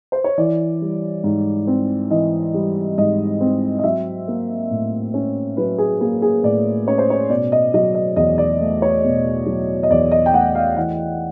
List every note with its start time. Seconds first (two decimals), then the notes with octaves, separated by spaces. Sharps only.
0.12 C5
0.24 C#5
0.38 E3 D5
0.82 G3
1.24 G#2
1.67 C4
2.10 E3 D#5
2.54 G3
2.98 G#2 D#5
3.41 C4
3.79 D#5
3.84 F#3 E5
4.28 A#3
4.71 A2
5.14 C#4
5.57 F#3 B4
5.78 G#4
6.01 A#3 G#4
6.22 G#4
6.43 A2 D5
6.87 C#4 C#5
6.98 C5
7.10 C#5
7.30 B2 D5
7.52 D#5
7.74 F#3 D#5
7.95 D#5
8.16 E2 D#5
8.38 D5
8.61 A3
8.82 C#5
9.04 B2
9.46 F#3
9.83 D#5
9.90 E2 D5
10.11 D#5
10.26 G5
10.33 A3 F#5
10.55 F5
10.77 E3 F#5